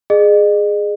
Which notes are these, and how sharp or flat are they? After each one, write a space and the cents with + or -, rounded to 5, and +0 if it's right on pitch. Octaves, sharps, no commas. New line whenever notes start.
G#4 +0 D#5 -40